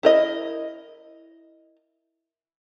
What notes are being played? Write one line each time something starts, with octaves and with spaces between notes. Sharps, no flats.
E4 A#4 D#5